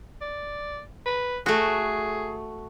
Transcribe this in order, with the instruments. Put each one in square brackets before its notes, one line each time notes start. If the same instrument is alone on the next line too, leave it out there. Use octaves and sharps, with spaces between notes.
[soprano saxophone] D5
B4
[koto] A3 F#4 [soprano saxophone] G#4